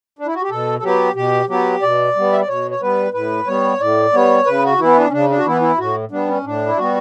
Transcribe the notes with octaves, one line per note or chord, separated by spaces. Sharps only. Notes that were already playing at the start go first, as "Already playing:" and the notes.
D4
E4
F#4
G4
B2 A4
A4
F#3 B3 G4
B2 G4
F#3 B3 G4
B2 D5
G3 B3
E5
D5
B2 C#5
C#5
G3 B3 B4
A2 B4
G3 B3 C#5
A2 D5
G3 B3 C#5
C#3 B4
F#4
E3 B3 E4
D4
C#4
C#3 D4
D4
F#4
E3 B3 E4
E4
A2 F#4
G3 B3 D4
C#4
A2 D4
E4
G3 B3 F#4